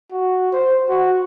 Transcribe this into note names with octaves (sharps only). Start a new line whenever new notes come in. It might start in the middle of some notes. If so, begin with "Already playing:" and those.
F#4
C5
F#4